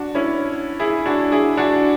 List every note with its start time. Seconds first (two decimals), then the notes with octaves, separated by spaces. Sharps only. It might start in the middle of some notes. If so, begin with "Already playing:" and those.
Already playing: D4 F#4
0.15 C#4 E4
0.79 E4 G#4
1.06 D4 F#4
1.32 E4 G#4
1.57 D4 F#4